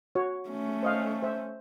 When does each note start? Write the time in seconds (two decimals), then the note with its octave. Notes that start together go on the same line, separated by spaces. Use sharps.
0.15 F#4 C#5
0.49 A3 C#4
0.83 C5 D#5 F5
1.22 C5 E5